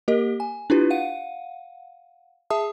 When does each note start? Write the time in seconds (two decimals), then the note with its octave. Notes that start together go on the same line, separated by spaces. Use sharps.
0.08 A#3 G4 A#4 D#5
0.40 G#5
0.70 D4 E4 F4 G4 B4
0.90 F5 F#5 D#7
2.50 G#4 E5 A5 D#6